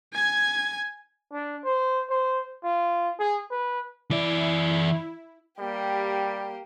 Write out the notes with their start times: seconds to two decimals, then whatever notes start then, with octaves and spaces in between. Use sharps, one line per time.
0.13 G#5 G#6
1.33 D4
1.64 C5
2.10 C5
2.64 F4
3.19 G#4
3.51 B4
4.11 E3 E4 D5
5.59 G3 A#3 G4